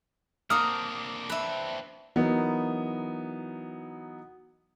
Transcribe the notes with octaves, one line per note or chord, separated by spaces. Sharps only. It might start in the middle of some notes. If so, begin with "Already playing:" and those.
A#3 C4 D4 A#4 F#5 D#6 F6
B4 E5
E3 F#3 B3 D#4 A#4